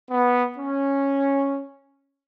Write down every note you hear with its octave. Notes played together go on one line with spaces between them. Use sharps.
B3
C#4